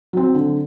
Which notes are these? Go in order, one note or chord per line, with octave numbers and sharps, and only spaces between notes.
F#3 C4
D3